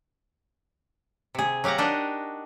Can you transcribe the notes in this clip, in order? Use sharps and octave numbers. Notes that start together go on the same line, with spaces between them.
C3 G#4
F#3 G4 F5 F#5 A#5
D4 D#4 F#4 G4 A#4 D#5